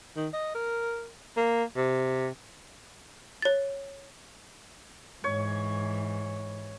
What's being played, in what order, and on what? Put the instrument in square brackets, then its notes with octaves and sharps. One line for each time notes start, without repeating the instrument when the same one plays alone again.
[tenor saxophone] D#3
D#5
A#4
A#3
C3
[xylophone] C#5 A6
[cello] G#2 E3 [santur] C#5